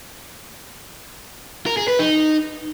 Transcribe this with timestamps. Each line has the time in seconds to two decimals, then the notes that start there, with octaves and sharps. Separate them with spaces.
1.66 A#4
1.77 G#4
1.88 B4
1.99 D#4